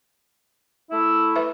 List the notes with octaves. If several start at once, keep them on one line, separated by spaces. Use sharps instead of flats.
A3 E4
B4 E5